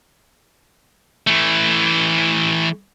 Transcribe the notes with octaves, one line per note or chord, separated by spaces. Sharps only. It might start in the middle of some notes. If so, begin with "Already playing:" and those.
E3 A3